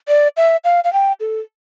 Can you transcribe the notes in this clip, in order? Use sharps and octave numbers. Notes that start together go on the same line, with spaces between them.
D5
E5
F5
F5
G5
A4